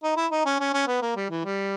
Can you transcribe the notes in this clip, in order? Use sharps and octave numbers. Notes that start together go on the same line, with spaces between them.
D#4
E4
D#4
C#4
C#4
C#4
B3
A#3
G3
E3
G3